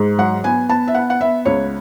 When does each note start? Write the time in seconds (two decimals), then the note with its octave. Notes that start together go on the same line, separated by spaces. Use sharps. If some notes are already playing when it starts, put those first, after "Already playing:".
Already playing: G#2
0.18 F#3 F#5
0.44 B3 G#5
0.69 B3 A5
0.88 E5
0.94 B3 F#5
1.10 F#5
1.21 B3 E5
1.45 C#2 C#5